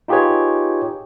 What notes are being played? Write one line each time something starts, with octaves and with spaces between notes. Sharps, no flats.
D#4 F4 G4 G#4 B4 C#5